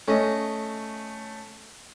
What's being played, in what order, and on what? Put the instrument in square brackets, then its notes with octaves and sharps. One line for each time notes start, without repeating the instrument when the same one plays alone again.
[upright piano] A3 [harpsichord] C#4 D#5